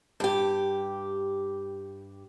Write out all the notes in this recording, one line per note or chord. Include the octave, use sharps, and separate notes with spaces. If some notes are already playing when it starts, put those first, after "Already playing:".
G2 G4